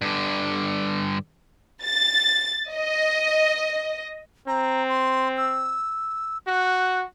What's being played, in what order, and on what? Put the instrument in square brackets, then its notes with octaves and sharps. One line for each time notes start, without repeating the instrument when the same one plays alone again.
[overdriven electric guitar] G2 D3
[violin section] A6
D#5
[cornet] C4 [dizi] A#5
[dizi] C6
E6
[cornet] F#4 [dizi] F#6